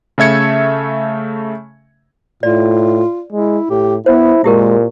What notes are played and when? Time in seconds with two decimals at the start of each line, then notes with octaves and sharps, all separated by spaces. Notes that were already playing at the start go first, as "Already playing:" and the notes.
0.18 C#3 A3 E5 G#6 C#7
2.43 A2 F4 D5
3.32 G#3 E4
3.70 A2 G4
4.06 B3 E4 C5
4.44 A#2 G#3 E4 G4 A#4